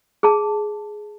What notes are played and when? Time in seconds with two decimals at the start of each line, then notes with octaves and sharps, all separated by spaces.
0.23 G#4 A5